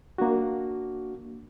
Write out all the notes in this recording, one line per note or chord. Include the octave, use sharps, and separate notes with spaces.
A#3 D4 F#4